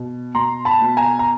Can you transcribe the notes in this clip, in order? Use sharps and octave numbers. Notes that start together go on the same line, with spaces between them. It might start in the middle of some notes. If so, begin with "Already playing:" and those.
Already playing: B2
B2 A#5 C6
A5 B5
B2
G#5 A#5
A#5